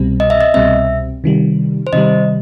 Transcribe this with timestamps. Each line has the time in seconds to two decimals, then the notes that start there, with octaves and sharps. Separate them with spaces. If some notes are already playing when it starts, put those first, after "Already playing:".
Already playing: C2 B2 G3 C4
0.20 D#5
0.30 E5
0.41 D#5
0.54 C2 B2 G3 C4 E5
1.24 C3 D#3 G3
1.87 C5
1.93 C3 D#3 G3 D#5